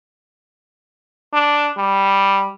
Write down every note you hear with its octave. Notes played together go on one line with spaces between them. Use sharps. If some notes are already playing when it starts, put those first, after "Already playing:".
D4
G3